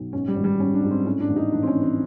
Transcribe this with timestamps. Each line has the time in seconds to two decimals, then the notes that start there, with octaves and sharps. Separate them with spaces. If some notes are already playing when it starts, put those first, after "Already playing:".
Already playing: B1
0.13 G#2 C#4
0.28 G3
0.36 G#1
0.44 G3
0.59 G#2 C#4
0.74 D4
0.82 G#2
0.91 C4
1.05 A2 C#4
1.21 D4
1.28 A1
1.36 D#4
1.52 A1 D4
1.63 C4
1.67 C#4
1.75 E3
1.82 C4